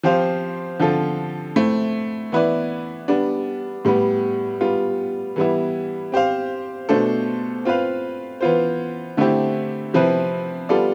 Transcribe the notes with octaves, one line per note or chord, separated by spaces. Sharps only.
F3 C4 G4 C5 F5
D3 F3 C4 F4 A4
A3 C4 E4
E3 B3 E4 B4 D5
G3 B3 D4
A2 G3 B3
G3 B3 F4
E3 G3 B3 E4
C4 G4 C5 F5
B2 A3 D4 A4 C5
C4 F4 B4 F5
E3 B3 F4 C5
D3 A3 C4 E4 G4
C3 F3 C4 E4 B4
G3 B3 F4 A4 D5